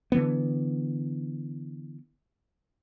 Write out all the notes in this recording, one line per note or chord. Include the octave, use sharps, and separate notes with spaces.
D3 E3 B3